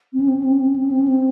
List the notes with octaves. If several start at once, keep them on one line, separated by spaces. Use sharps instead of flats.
C4
C#4
C4
C#4
C4
C#4
C4
C#4
C4
C#4
C4
C#4
C4